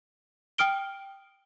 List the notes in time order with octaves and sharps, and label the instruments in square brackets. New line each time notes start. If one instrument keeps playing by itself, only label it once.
[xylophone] G5 D#6 F6 D7 G7